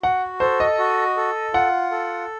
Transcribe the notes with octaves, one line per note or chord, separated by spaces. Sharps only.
F#4 F#5
A4 C5
D#5
F#4
A4
F4 F#5
A4